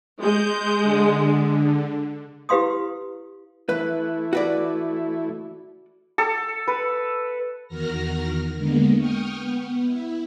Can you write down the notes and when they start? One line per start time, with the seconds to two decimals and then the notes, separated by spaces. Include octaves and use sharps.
0.20 G#3 G6
0.83 D3
2.49 E4 G4 B4 F5 C6 D#6
3.69 E3 A3 E4 B4
4.33 F#4 B4 D5
6.18 A4
6.68 B4
7.68 E2 D#3 F#4 A#4 F6 A#6
8.56 D3 G#3 A#3 B3
8.97 G5 C#6 D#6 F6
9.36 B3
9.84 E4